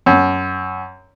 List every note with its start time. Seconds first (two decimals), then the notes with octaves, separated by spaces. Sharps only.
0.06 F#2